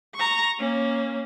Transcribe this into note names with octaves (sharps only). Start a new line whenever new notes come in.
A#5 C#6
A#3 C#4